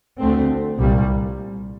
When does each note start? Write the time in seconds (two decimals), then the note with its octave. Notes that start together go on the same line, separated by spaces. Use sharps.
0.19 D2 D3 A3 C4
0.79 C2 A#2 G3